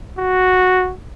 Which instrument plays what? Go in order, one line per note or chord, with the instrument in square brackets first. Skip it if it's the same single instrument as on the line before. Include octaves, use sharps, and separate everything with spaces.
[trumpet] F#4